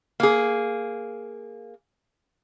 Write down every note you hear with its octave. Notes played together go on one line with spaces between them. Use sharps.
A#3 G#4